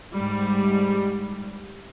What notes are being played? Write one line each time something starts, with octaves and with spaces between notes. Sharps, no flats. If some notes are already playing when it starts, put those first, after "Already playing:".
G#2 G3